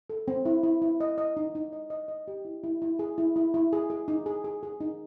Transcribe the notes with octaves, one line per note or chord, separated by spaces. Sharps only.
A4
C4
E4
E4
E4
D#5
D#5
D#4
D#4
D#5
D#5
D#5
G4
E4
E4
E4
G#4
E4
E4
E4
G#4
G#4
D#4
G#4
G#4
G#4
D#4